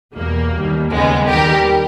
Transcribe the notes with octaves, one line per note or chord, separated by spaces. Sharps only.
E2 B2 G3 A#3
D#2 D#3 G3
D#2 C#3 G3 G#3 B3
D#2 D#3 G3 G4 A#4